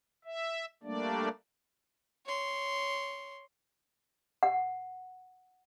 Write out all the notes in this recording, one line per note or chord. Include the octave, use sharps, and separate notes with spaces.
E5
G3 A3 A#3 D4 D5
C#5 C6
F#5